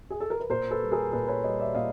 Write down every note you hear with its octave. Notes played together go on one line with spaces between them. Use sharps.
G#4
A4
A#4
B4
A#2 A#4 C5
A4 B4
G3
G#4 A#4
A#2 A4 B4
B4 C#5
G3 C#5 D#5
D5 E5
A#2 D#5 F5